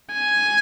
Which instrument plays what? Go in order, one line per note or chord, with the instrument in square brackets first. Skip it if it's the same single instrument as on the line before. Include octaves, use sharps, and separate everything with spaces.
[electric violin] G#5